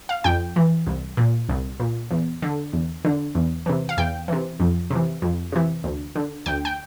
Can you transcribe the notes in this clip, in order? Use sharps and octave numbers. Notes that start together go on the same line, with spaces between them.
F5
F2 G5
E3
C2
A#2
C2
A#2
E2
D3
E2
D3
E2
C3 E3
F5
E2 G5
C3 E3
F2
C3 E3
F2
C3 E3
D2
D3
D2 G5
G5